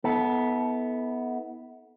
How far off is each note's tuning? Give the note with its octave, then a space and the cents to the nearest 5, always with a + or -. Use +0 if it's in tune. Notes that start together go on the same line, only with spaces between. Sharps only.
B3 +0 E4 -40 A4 -15